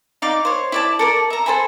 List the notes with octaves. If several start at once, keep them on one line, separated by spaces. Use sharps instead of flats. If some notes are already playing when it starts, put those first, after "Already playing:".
D#4 D5 F5 D6
C5 C#5
E4 D5 A5
A4 A#4 D5
E5 A#5
A4 C5 G#5 B5